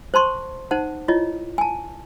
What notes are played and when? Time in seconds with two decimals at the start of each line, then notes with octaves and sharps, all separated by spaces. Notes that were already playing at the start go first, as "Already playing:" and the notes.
0.14 C5 A5 C6 C#6
0.71 D#4 C5 F#5 A5
1.08 E4 F4 C#5 D#5
1.58 G#5 A5